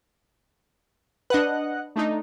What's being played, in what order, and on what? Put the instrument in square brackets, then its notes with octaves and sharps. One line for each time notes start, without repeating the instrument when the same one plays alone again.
[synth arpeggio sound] D4 B4 [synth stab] D#5 F#5 F#6
[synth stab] A3 D4 D#4